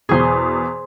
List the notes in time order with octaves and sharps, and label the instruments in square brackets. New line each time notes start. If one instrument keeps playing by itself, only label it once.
[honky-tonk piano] E2 B2 [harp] G#4 C5 C6